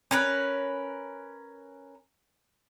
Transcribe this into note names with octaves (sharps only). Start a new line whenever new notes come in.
C#4 A#4 B4